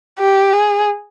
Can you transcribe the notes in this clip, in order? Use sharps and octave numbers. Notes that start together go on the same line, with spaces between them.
G4
G#4